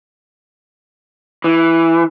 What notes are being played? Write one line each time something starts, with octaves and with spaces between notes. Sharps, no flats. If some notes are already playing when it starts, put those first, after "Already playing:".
E3